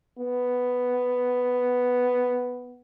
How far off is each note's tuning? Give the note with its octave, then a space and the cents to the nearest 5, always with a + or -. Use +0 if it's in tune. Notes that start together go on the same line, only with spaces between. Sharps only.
B3 +5